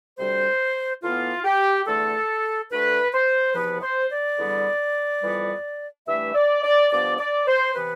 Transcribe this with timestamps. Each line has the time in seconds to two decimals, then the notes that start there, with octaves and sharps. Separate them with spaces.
0.18 D2 C3 G3 C5
1.02 A2 E3 B3 F4
1.44 G4
1.87 E2 D3 A3 A4
2.71 D2 D3 A3 B4
3.13 C5
3.54 E2 C3 F3 B3 B4
3.82 C5
4.11 D5
4.39 E2 D3 G3 B3
5.22 F2 E3 G3 B3
6.07 G2 E3 A3 E5
6.34 D5
6.63 D5
6.91 G2 F3 B3 D5
7.19 D5
7.47 C5
7.75 C3 E3 B3 B4